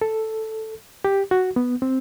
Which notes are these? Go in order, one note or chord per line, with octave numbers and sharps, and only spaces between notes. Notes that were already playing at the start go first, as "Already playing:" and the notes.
A4
G4
F#4
B3
C4